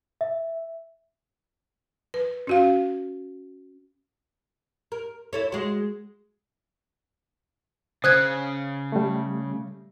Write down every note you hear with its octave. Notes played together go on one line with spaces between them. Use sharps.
E5
B4
C#4 F#4 F5
A#4
E4 A4 C#5
G#3 F#4
C#3 C5 D#6 F#6 G#6
G3 A3